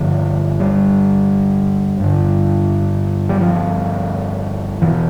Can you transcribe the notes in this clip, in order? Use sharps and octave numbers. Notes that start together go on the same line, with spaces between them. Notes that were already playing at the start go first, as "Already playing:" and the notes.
Already playing: G2 D3 F3
G3
G2 D3
G3
F3
E2 B2 E3